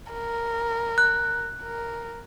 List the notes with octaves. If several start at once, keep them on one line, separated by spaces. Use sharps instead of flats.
A#4
F#6
A#4